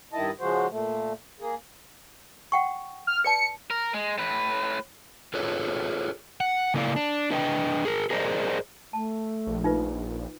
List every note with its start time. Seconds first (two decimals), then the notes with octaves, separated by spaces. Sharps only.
0.13 G2 D#3 E4 D#5 A5
0.40 C#3 F3 G#3 F#4 C5
0.70 A#2 A3
1.40 A#3 G#4
2.52 F#5 G5 C#6
3.07 F6
3.24 B4 D5 A5 C#7
3.70 A#4
3.94 G#3
4.18 A2 B4
5.34 F4 G#4 A4 B4 C#5
6.40 F#5
6.74 C#3 A#3 E4 D5 F5
6.96 D4
7.31 D4 B4 D#5 F#5 G5
7.85 G#4 A#4
8.10 G#4 A#4 C5 D5 D#5
8.93 A3 A5
9.47 A#1
9.64 D#4 F4 B4